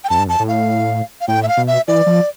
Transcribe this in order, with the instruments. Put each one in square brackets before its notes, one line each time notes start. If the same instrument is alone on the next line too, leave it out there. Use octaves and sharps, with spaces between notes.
[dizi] G5
[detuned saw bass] F2 [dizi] A5
[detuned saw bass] G2
[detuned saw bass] F2 [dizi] A5
[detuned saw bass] A2
[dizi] F5
F5
[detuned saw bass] A2 [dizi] G5
[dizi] E5
F5
[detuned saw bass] B2
[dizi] E5
[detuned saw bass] E3 [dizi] D5
[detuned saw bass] F3